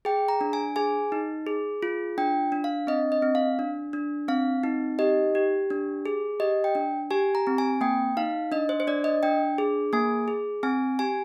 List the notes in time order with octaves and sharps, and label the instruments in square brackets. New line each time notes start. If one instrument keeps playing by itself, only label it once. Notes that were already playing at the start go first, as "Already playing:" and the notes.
[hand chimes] G#4 G5
A#5
D4
G#5
G#4 G#5
D#4
G#4
F4
D4 G5
D4
F5
C4 D#5
D#5
C4
F5
D4
D4
C4 F5
D#4
G4 D#5
G4
D4
G#4
G4 D#5
G5
D4
G4 G#5
A#5
C4
G#5
A#3 G5
D#4 F5
D4 D#5
C5
C5
D4 D5
D#5
D4 G5
G#4
A#3 G#5
G#4
C4 G#5
G4 G#5